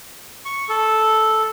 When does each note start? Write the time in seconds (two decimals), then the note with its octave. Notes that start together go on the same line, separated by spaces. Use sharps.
0.45 C#6
0.69 A4